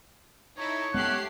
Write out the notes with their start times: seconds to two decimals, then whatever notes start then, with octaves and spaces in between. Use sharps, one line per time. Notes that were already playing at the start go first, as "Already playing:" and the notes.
0.58 D#4 E4 A4 C#5
0.94 G#3 A3 B3 C#4 G4 F#6 C7